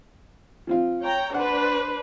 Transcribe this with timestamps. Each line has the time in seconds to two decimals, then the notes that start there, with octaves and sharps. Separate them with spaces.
0.67 F3 C4 F4
1.02 C#5 G5 A#5
1.34 D4 B4 C5 F#5